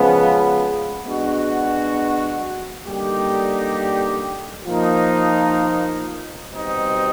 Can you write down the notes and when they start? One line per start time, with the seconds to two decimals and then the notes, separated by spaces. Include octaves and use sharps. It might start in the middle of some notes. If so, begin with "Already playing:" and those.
Already playing: C#3 F3 G#3 B3
1.06 G#3 B3 D4 F#4
2.86 D3 G3 A#3 D#4 G4
4.67 F3 A#3 D#4
6.48 B2 G3 C4 D#4